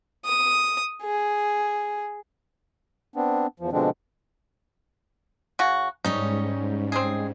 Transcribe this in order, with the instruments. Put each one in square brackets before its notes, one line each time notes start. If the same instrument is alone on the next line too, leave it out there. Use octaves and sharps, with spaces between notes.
[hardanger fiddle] D#6
G#4
[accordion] B3 C4 D4
E2 F3
B2 D3 F3 G#3 C4 D4
[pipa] C#3 F#4
[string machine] G#2 [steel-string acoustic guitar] G3 C#4 C#5 [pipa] D#4
[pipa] C4 D#4 G#4